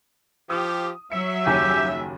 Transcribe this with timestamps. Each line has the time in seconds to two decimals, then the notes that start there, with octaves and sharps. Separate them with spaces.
0.50 F3 G4 D#6
1.12 F#3 E5 C#7
1.46 F#1 D#2 G4 G#5